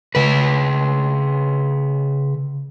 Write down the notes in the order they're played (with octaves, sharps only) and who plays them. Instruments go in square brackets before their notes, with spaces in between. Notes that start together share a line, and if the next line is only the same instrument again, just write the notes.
[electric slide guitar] C#3 B4